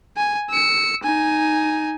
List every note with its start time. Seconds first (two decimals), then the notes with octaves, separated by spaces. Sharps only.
0.17 G#5
0.50 E6 C#7
1.03 D#4 G#5